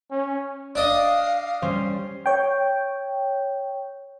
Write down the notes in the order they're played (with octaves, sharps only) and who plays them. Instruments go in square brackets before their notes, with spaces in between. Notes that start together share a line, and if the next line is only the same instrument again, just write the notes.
[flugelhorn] C#4
[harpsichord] D4 D#5 [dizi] F5
[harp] G3 C#4 C5
[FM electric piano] C#5 G5